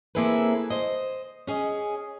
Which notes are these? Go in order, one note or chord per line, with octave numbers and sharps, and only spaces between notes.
A#3 C4 E4 G#4 A4 B4
C5 D#5
C#4 G#4 D#5